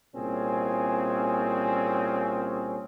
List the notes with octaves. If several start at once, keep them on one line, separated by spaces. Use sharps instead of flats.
C2 A#2 C4 C#4 G#4